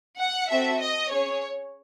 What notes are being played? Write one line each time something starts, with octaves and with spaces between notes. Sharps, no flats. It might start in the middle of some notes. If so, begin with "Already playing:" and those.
F#5
C4 F#4 A4 E5
D#5
C#4 G#4 C#5